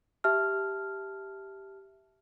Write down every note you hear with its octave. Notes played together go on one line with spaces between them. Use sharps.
G4 E5 A5 F6